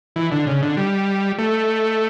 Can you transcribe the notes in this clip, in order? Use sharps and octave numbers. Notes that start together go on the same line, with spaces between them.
E3
D3
C#3
D3
G3
A3